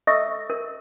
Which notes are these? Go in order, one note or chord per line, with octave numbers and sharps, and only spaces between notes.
A4 D#5 E5 C#6 E6
A#4